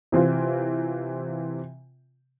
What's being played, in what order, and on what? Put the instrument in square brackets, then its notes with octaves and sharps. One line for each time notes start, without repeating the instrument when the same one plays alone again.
[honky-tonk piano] C3 E3 C4 F4